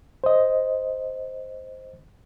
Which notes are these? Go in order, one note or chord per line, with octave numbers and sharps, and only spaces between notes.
C5 D#5